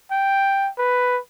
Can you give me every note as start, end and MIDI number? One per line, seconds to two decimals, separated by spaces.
0.11 0.70 79
0.78 1.19 71